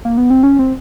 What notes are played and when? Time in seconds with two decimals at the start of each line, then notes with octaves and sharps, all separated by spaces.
0.05 A#3
0.18 B3
0.30 C4
0.43 C#4
0.59 C4